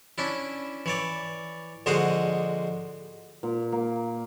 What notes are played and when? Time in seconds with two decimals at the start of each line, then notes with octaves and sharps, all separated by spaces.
0.18 C#4 D4 E4
0.86 E3 C#5 D5
1.86 A#1 D3 G#3 F#4 C5 D#5
3.43 A#2
3.72 A#3